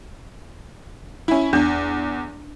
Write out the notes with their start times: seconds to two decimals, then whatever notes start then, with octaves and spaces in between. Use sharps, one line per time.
1.28 C#4 E4
1.53 E2 D4